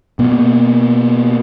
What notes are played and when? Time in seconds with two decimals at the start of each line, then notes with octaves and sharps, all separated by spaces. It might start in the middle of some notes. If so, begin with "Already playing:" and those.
0.19 B2 A#3